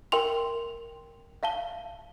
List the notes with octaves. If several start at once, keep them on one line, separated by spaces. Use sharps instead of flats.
A#4 E5 G5 C6 F7
E5 F5 A5 G7